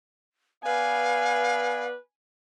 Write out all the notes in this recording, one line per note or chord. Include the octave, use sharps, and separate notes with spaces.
B3 B4 D5 F5 G#5